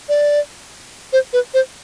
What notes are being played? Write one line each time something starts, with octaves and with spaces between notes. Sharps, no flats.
D5
C5
B4
C5